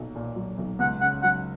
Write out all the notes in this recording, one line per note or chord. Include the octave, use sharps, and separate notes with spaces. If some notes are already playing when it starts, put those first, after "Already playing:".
Already playing: B1 A#2 F#3
A#2
F#3
B1
C#2 F#5
C#3 F#5
F#3 F#5